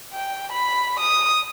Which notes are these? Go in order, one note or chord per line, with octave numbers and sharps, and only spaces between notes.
G5
B5
D#6